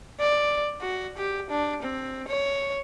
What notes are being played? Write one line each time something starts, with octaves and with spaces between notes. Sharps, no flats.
D5
F#4
G4
D4
C4
C#5